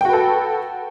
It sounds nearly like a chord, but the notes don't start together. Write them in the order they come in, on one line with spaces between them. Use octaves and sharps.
G5 F#4 B4 A4